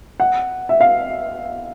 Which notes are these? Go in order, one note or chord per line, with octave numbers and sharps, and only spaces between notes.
F#5
E5
F5